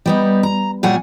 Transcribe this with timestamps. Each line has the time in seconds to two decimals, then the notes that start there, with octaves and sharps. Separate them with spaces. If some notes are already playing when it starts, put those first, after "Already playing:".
0.06 G3 B3 D#4
0.43 A#5
0.83 A#2 F#3 G3 F#5 G#5